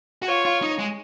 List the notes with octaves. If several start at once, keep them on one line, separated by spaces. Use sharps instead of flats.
F#4
F4 C#5
F4
D#4
G#3